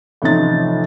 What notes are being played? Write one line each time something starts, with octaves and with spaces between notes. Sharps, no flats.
A1 C3 F3 D#4 A6